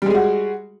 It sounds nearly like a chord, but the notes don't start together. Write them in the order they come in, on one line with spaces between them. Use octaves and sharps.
G3 G#3 G#4 F#4